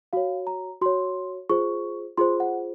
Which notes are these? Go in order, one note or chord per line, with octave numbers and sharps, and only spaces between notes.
F#4 C#5 F5
A#5
F#4 C#5 C6
F4 G#4 C5 C#6
F4 G#4 C5 C6
F#5